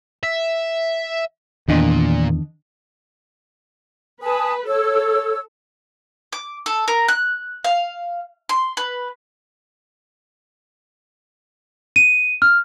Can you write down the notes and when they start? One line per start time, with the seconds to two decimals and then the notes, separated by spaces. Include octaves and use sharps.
0.23 E5
1.68 E2 A#2 D#3 D4 D#5
4.22 B4 G#5 A5 D#6
4.67 A4 C#5 E6
6.33 D6
6.66 A4
6.88 A#4
7.08 F#6
7.64 F5
8.49 C6
8.77 B4
11.96 D#7
12.42 F6